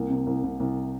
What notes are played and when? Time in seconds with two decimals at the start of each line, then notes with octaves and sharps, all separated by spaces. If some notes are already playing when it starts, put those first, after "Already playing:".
Already playing: C2 A#3
0.09 C3
0.26 C2
0.43 C2
0.60 C2